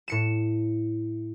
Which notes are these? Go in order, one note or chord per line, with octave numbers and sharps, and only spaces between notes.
A2 C#7 E7